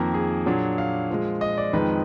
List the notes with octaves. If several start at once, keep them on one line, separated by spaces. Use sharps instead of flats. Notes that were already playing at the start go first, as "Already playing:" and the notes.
Already playing: F2 D#3 A#3 A#4
G#4
A#2 F#3 D4
F5
A#2 F3 G#3
D#5
D5
F2 D#3 G#3 D#4 B4